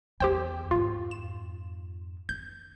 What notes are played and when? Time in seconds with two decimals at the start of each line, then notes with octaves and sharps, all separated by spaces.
0.20 E2 E4 G4 C5 G5
0.71 F2 G#2 F4
1.11 E7
2.29 C#4 G6